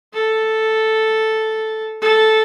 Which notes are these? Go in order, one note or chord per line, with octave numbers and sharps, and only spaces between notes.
A4
A4